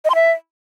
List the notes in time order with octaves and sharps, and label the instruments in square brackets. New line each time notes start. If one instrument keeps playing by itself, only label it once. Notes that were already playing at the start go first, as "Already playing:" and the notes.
[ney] D#5
C6
E5